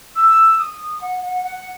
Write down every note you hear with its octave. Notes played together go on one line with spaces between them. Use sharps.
E6
D#6
F#5
F#5
F#5